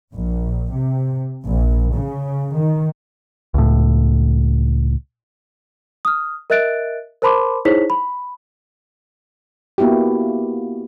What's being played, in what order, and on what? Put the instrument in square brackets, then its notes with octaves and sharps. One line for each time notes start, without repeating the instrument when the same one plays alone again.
[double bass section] A#1
C3
A#1
C#3
D#3
[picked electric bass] C#2 A2
[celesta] D#6 F6
A#4 D#5 E5 F#6 A6 D7
A#4 C5 A5 B5 C6 D6
D#4 E4 G#4 C5 C#5 B6
B5
[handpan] A#3 B3 E4 F#4 G4